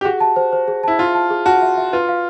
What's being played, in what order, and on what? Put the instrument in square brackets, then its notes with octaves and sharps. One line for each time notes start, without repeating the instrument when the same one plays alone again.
[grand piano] G4
[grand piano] F#4 [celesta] G#4
[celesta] A5
C5
C5
G#4
[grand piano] E4 [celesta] A5
[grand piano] F4 [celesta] E5
[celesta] A5
G#4
[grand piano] F#4 [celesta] A5
[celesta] E5
E5
[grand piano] F4 [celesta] B4
[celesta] F5